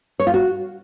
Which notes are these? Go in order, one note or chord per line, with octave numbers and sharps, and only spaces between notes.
C#5
F4
F#4